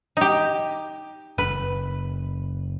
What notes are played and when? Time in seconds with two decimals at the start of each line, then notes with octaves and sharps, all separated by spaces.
0.17 D#4 G4
1.38 F#1 B4